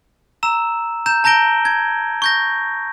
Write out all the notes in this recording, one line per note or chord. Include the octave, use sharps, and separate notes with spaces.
A#5 E6 E7
A#5 G6 E7
A5 A#5 G6 A#6 D7 G7
G#6
C#6 G6 A#6